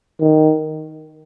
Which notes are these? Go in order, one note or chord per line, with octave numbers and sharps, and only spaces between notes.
D#3